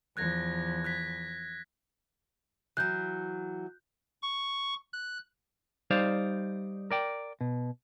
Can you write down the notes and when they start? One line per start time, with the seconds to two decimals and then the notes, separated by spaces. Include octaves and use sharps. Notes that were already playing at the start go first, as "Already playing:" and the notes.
0.17 E2 F3 F#6 G#6 A#6
0.84 F#6 G#6 B6
2.77 E3 F#3 F#6 G6
4.22 C#6
4.93 F#6
5.91 G3 D#4 C5 D5 F5
6.91 A#4 D5 G5
7.41 B2